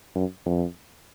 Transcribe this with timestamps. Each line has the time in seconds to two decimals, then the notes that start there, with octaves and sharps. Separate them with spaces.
0.15 F#2
0.46 F2